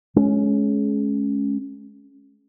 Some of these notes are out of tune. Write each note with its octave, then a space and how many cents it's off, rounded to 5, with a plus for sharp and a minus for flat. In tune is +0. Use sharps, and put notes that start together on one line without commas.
G#3 +30 C#4 +5